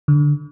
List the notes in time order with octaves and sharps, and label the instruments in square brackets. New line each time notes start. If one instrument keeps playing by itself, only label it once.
[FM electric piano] D3